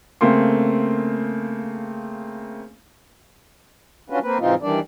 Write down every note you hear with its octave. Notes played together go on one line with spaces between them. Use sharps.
C#3 A3 A#3 C4 C6
C#4 D4 F4 F#4 B4
A#3 C4 B4
G#2 C3 E3 C4 D#4 F4
D#3 E3 G3 D4 D5